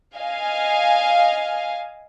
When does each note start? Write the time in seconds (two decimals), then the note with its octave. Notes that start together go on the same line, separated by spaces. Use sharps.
0.16 D#5 F5 G#5